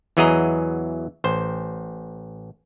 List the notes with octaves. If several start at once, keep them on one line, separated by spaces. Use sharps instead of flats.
E2 E3 F#3 G#4 D#5 A#5
A1 C5